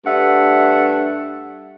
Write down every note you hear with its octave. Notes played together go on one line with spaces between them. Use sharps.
G2 G3 A3 E5 F#5